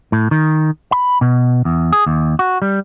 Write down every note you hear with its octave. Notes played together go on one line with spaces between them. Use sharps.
A2
D#3
B5
B2
E2
G#4
D#2
F#4
G3